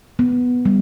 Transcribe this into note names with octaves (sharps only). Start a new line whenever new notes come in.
B3
G3